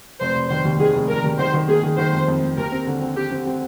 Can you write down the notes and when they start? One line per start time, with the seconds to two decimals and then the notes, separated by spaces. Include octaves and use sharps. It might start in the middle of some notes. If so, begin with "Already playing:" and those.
0.20 F1 C5
0.35 F1
0.50 D#3 C5
0.65 D#2
0.79 D#3 G#4
0.95 F1
1.09 F1 A#4
1.24 D#2
1.39 D#3 C5
1.54 D#3
1.68 A#3 G#4
1.83 D#3
1.98 D#3 C5
2.13 F2
2.28 F2
2.43 F2
2.58 D#2 A#4
2.72 C4
2.87 D3
3.01 C4
3.16 C4 G4
3.31 C4
3.46 C4